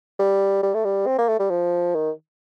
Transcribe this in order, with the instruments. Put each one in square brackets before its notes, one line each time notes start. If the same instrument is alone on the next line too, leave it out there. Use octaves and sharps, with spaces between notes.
[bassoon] G3
G3
A3
G3
C4
A#3
A3
G3
F3
D#3